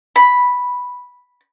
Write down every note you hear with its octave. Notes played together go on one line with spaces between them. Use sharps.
B5